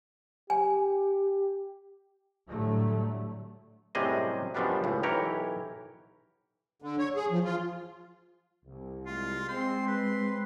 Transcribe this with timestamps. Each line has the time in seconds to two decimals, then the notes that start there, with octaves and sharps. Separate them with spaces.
0.50 G4 G#5
2.48 A2 D3 F#3 G3 A3
3.95 F#2 A2 C3 G3 G#4 D#5
4.54 F#2 B2 F3 G3 B3 D4
4.84 C#2 A2
5.03 B1 E3 G4 A#4 C#5 A#5
6.82 D3
6.98 C#5
7.15 G#4
7.31 F3
7.44 F4
8.65 C2
9.06 G#3 F4 C6
9.48 C4 C5 C6
9.87 B4 C6